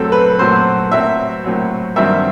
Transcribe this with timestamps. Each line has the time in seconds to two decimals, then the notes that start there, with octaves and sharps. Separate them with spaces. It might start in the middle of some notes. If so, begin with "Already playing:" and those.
Already playing: F#2 F#3 A3 C4 A4
0.12 B4
0.38 F#2 F#3 A3 C4 C5
0.91 A2 F#3 C4 E5
1.44 A2 F#3 C4
1.96 G2 D#3 F#3 C4 E5